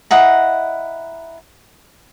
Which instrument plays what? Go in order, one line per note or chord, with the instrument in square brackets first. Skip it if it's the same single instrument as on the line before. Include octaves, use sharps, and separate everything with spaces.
[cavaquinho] E4 D#5 F#5 A#5